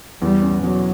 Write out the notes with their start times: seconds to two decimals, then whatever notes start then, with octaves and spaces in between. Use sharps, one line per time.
0.22 E2 G3
0.42 C#4
0.63 B2 F#3